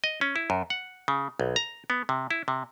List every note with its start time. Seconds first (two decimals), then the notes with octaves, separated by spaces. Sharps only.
0.04 D#5
0.21 C#4
0.36 E4
0.50 F#2
0.70 F#5
1.08 C#3
1.40 B1
1.56 A#5
1.90 B3
2.09 C3
2.31 E4
2.48 C3